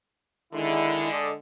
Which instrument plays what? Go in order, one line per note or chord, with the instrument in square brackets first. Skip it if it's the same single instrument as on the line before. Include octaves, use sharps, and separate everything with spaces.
[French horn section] D3 G#3 [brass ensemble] D#3 E4
[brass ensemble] A4 D5 D#5